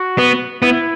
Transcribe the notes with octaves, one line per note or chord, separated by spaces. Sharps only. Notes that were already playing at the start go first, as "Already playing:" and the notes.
Already playing: F#4
B3
B3 E4